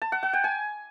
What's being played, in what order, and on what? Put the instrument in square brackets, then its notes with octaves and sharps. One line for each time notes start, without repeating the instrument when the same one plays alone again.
[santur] A5
F#5
F#5
G5
G#5